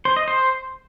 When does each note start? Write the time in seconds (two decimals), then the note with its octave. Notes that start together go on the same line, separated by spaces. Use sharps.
0.05 C5
0.16 D#5
0.28 C5